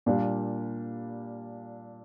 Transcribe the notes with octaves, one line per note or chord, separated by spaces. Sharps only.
A#2 G3 A#3 D4